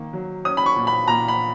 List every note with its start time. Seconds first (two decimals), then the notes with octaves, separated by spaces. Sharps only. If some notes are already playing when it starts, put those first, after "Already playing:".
Already playing: D#3 A#3
0.13 F#3
0.45 C#4 D#6
0.57 B5
0.66 C#6
0.76 A#2
0.87 B5
1.08 A#2 A#5
1.28 B5